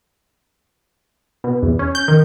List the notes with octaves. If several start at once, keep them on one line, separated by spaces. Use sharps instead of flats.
B2
E2
C#4
G6
D#3